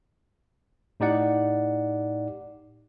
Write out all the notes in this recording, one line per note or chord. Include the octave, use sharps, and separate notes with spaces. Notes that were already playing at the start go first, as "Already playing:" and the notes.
A2 D#4 G4 D5 F#5